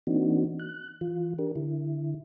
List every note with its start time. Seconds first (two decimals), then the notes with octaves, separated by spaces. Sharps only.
0.07 E3 A#3 C4 D4 D#4 F#4
0.59 F#6
1.01 E3 F4
1.39 D4 G4 A#4
1.56 D3 E4